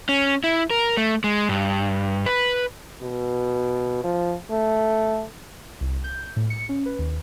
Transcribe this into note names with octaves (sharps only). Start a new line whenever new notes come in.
C#4
E4
A#4
A3
G#3
G2
B4
B2
F3
A3
C2
G6
A2
C#7
C#4
B4
D#2